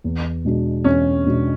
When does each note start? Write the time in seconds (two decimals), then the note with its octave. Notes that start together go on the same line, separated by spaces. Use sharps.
0.04 E2
0.45 B2 G#3 D4 F#4
0.84 E2 C#4
1.26 B2 G#3 D4 F#4